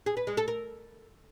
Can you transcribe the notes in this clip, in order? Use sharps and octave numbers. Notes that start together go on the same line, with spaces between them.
G#4
B4
G#3
A4
A#4